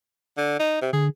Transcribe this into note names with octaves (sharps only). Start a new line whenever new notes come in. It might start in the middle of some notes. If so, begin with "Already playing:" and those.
D3
D#4
C3
D3 G#4